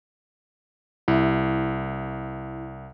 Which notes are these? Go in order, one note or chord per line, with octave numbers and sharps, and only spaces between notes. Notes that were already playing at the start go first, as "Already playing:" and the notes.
C2 E4